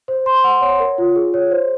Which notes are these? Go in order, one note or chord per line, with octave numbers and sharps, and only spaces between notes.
C5
C6
F#5
C#5
A#4
F4
G#4
C#5
C5